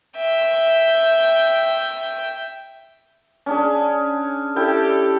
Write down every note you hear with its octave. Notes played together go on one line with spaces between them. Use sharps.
E5 G5
C#4 D4 G#4
D4 E4 G4 A4 G5